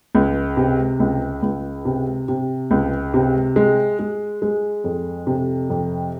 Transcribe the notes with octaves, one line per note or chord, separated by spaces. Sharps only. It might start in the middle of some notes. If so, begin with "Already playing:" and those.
C#2
C3
C#2
C#2
C3
C3
C#2
C3
G#3
G#3
G#3
F2
C3
F2